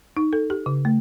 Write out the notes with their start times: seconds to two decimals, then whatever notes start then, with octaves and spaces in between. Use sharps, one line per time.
0.17 D#4
0.33 A4
0.50 G4
0.66 C#3
0.85 A3